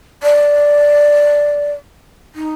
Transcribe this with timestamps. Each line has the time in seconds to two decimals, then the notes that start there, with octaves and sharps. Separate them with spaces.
0.23 D5
2.35 D#4